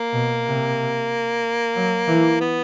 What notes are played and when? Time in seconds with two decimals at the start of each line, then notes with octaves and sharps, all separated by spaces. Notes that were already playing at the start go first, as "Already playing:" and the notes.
Already playing: A#3
0.12 B2
0.45 C3
1.75 F#3
2.07 E3
2.40 B3